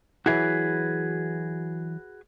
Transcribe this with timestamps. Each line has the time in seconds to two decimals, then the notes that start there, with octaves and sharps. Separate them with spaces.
0.26 E3 F#3 E4 F#4 G#4 B4